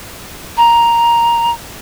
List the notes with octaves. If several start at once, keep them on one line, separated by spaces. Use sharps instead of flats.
A#5